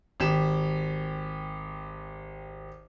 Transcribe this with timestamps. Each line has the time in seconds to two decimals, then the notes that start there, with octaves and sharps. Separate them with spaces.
0.20 G#1 G4 E7